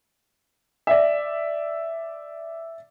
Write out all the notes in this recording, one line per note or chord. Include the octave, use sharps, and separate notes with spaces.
D5 E5